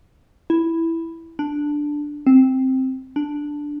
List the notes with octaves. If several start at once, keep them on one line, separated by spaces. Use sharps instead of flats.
E4
D4
C4
D4